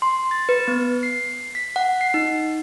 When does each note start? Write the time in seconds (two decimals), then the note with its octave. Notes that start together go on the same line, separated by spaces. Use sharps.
0.02 C6
0.31 A6
0.49 B4
0.68 B3
1.03 C7
1.55 B6
1.76 F#5
2.01 C7
2.14 D#4